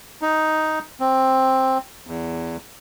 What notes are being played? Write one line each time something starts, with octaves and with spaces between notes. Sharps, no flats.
D#4
C4
E2